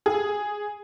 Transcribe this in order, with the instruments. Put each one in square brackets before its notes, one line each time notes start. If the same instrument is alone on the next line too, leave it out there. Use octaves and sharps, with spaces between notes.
[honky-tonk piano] G#4